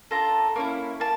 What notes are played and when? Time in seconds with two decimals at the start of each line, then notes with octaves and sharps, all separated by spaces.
0.11 D4 F4 A4 A#5
0.56 A#3 C#4 E4
1.00 A#3 A5